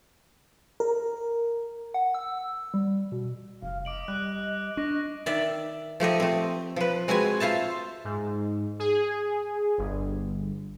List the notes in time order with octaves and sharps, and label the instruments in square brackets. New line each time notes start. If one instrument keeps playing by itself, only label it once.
[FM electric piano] A#4
[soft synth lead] F#5
E6
G3
B2
[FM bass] F1 [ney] F5
[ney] D#5 [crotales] D6 D7 F#7
[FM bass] G3 [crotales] F#6
[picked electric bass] D4 [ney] D#5 [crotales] C#6 A#6
[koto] D#3 D5 E5
F3 A3 G4 D#5
A3 C4
F3 B4
G#3 C4 F#4 B4 G#5
F4 C5 E5 A5
[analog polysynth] G#2
G#4
G1